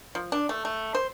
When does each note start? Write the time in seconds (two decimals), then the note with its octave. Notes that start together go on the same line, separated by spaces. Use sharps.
0.15 F3
0.32 D4
0.49 A3
0.65 A3
0.95 C5